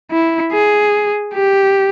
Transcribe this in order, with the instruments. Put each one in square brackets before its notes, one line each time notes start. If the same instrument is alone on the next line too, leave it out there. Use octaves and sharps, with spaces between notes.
[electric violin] E4
G#4
G4